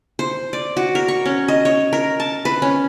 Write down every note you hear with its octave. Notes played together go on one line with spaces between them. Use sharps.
C5
D5
F#4
A#4
C#6
C#4
D#5
C#5
A#4
A5
B4
C#4